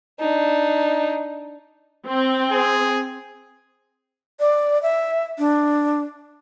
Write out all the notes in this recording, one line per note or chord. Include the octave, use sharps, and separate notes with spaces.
D4 D#4
C4
G#4
D5
E5
D4